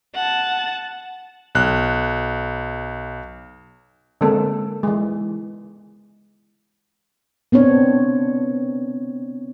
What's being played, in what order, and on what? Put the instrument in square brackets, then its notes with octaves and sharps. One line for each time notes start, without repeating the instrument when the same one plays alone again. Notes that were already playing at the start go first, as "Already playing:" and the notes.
[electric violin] F#5 A5
[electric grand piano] B1 F#6
[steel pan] D3 G#3 A#3 C4 A4
E3 G#3
[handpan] B3 C4 D4 C#5